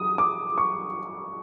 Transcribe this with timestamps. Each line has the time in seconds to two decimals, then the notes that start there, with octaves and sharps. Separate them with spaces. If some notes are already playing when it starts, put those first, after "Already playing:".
Already playing: F#3 D#6
0.18 D6
0.58 C#6